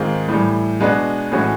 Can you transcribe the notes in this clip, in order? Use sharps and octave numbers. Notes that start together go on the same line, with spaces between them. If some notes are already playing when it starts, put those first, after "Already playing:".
Already playing: G#2 D#3 G#3 C4 F4
A2 E3 G3
B2 G#3 B3 D4 F#4
A2 E3 G#3 C#4 F#4